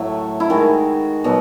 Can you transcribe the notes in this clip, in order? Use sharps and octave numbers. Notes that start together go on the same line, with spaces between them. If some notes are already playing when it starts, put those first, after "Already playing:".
Already playing: A2 F#3 A3 E5
E4
D#3 G#3 F#4
B2 F#3